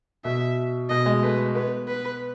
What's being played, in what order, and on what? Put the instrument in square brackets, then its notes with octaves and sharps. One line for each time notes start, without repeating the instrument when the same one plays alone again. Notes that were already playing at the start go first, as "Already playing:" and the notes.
[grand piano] B2 [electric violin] E5
[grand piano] B2 [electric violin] D#5
[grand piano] G#3
[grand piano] A3 [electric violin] B4
[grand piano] B3 [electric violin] B4
[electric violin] B4